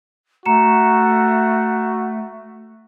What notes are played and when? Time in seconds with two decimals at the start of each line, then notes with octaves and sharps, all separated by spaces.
0.46 A3 F#4 A#5 C#7 E7